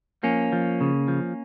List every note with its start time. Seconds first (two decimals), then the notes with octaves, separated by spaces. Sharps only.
0.23 F3 A#3 C#4
0.53 F3
0.81 C#3
1.08 F3